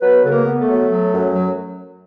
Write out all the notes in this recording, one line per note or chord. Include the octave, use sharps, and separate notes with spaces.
F#3 B3 B4
C#3 A4
A#3 A#4
B3
A3 A4
F#3
F#3
F#2
F#3